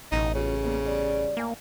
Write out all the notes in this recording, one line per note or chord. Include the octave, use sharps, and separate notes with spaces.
A1 B2 B3 D#4
C#3 C#4 F4 F#4
G3 A#3 B3
G3 D5
A2 A#3 G#5